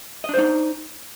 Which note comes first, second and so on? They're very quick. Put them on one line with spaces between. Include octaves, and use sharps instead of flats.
D#5 D4 C5 D#4